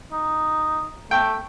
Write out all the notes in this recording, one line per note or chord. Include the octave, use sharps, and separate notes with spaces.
D#4
A3 G5